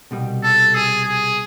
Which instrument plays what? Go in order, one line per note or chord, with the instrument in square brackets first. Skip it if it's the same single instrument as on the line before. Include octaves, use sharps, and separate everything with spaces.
[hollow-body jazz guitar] C2 B2 G3
[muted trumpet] A4
G#4
G#4